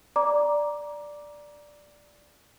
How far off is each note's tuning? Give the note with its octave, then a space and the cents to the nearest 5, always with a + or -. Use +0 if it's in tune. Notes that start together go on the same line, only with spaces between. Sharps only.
D5 +0 A#5 +15 D6 +0